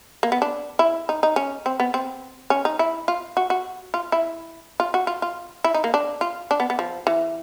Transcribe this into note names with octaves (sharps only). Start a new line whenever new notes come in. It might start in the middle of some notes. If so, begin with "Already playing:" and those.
A#3
B3
D4
E4
D#4
D#4
C#4
C4
B3
C4
C#4
D#4
E4
F4
F#4
F#4
F4
E4
F4
F#4
F4
F4
E4
D#4
A#3
D4
F4
D4
B3
B3
F3
E3